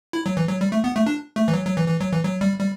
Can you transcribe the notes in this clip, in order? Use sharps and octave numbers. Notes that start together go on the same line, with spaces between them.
E4
F#3
E3
F#3
G3
A3
B3
A3
D4
A3
E3
F#3
F#3
E3
E3
F#3
E3
F#3
G3
G3